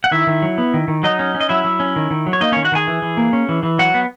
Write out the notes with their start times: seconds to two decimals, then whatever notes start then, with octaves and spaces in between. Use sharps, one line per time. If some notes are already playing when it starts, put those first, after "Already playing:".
0.04 F#5
0.11 D#3 E4 E5
0.27 D#3
0.42 F#3
0.58 B3
0.74 D#3
0.88 D#3
1.03 F#3 D#4 D#5
1.19 C#4
1.35 C#4
1.41 D#5
1.49 F#3 E4 E5
1.64 F#3
1.80 C#4
1.96 D#3
2.11 D#3
2.27 F#3
2.33 C#5
2.41 A#3 D#4 D#5
2.52 D#3 C#4 C#5
2.64 F#4 F#5
2.72 D#3 G#4 G#5
2.87 E3
3.02 E3
3.17 A#3
3.33 C#4
3.49 E3
3.63 E3
3.79 F#3 F#4 F#5
3.94 B3